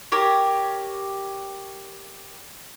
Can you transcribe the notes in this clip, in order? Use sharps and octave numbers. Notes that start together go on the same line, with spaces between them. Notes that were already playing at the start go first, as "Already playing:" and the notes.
G4 A#4 C#5